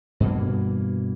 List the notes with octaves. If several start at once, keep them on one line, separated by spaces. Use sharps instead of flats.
G2 B2 E3 A#3